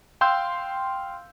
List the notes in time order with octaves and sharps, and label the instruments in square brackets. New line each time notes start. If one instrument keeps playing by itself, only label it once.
[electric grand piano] F5 G5 C6 E6 G6